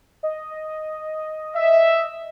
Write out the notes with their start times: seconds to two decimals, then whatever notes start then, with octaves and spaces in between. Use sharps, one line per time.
0.23 D#5
1.55 E5